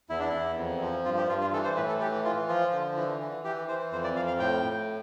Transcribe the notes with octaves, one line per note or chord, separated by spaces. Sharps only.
E2 E4
D4
E2 E4
F2
F3
G2 F4
G4
G2 F4
F4
E3 A4
C5
A2 B4
A4
E3 G4
E3 F4
F3 F4
D3
E3
E3
E3 G4
E3 C5
F2 C5
D5
F2 F5
F5
A2 G5
A2